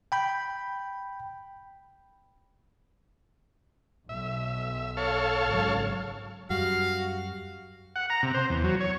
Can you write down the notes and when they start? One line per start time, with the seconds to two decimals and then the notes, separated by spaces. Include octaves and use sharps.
0.12 G5 B5 G6
4.09 B1 E5
4.97 A4 C#5 F5
5.43 G#1 C#3 F#3
6.50 F#2 G3 F#4 F5
7.96 F#5
8.10 A#5
8.23 C3
8.34 C5
8.50 E2
8.64 F#3
8.80 C#5